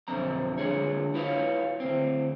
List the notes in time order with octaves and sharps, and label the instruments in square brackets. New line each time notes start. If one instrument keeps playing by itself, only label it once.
[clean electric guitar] B1 F2 D3 C4 A#5
D3 G#3 D4 G#4 C#5
E4 F#4 B4 C#5 F5
D2 C4